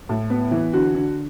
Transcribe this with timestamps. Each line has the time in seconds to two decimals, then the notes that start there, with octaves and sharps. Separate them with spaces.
0.09 A2
0.30 B3
0.51 E3
0.73 D3 F#4
0.94 D3